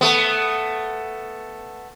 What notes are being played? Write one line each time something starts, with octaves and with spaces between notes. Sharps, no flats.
A3 B3